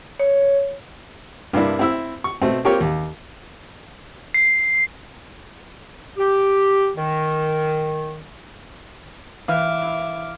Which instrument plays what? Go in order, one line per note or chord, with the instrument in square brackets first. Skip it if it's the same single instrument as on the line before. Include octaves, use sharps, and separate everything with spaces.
[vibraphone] C#5
[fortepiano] G2 C3 G3 A#3 D4 E4
C4 E4 E6
C#6
B2 A3 C4
A#3 C4 F4 G4 A#4 C#5
D#2
[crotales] C7
[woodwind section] G4
D#3
[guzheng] E3 B4 G5 [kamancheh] E5 D6 [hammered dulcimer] F5
[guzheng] E4